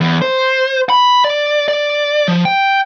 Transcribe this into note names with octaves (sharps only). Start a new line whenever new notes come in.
E2
C5
B5
D5
D5
F3
G5